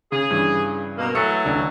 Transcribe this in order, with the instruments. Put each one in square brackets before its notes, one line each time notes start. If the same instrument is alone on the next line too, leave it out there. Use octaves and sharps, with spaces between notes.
[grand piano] C#3 [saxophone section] G#4
[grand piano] G2 C#3 E3
[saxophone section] B2 A#3
[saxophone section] E3 F#3 A3 [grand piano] D#6 E6 C#7
[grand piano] D#1 C#2 D4